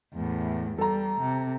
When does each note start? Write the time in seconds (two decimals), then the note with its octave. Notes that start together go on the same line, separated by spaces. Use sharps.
0.14 E2 A2
0.78 G3 A4 A#5
1.21 C3